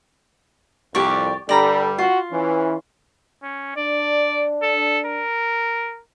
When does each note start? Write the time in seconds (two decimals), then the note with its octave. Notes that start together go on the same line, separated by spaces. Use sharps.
0.95 C2 F2 G4 D5 C#6
1.49 G2 D3 G3 A4 D5 A#5 B5
1.98 F4 F#4
2.32 E3 C#4
3.43 C#4
3.76 D4 D5
4.62 A4
5.05 A#4